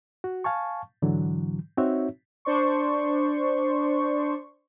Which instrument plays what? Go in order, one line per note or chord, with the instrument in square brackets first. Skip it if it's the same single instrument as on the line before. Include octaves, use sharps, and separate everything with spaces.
[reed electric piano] F#4
F5 G#5 A5 C#6
G#2 D3 E3 F#3
C4 D#4 F#4 C#5 E5
[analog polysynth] D4 C5 D5 C6 C#6